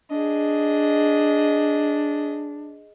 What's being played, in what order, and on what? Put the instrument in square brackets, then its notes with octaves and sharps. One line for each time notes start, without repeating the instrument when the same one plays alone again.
[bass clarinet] D4 [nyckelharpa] G#4 D#5